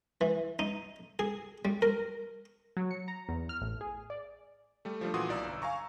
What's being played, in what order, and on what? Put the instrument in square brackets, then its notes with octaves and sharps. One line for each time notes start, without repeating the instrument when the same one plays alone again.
[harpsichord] E3
D#4
G#4
G3
A#4
[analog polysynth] F#3
C#7
A#5
E2
F6
A1
G#4
D5
[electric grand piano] G3 A3
F3 G3 A3 D4
A#2 E3 F#4 C6 D#6
B1 D5 A#5 E6
G1
F5 G#5 A#5 C#6